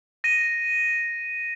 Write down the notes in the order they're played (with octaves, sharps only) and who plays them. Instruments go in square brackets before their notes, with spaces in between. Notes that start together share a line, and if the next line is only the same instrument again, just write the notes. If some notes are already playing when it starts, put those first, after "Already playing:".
[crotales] A#6 D#7